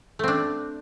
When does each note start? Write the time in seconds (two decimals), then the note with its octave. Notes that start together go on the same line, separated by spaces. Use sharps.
0.19 A3
0.24 C4
0.28 D4